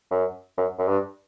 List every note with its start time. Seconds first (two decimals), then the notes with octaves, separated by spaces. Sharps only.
0.11 F#2
0.57 F#2
0.79 F#2
0.88 G2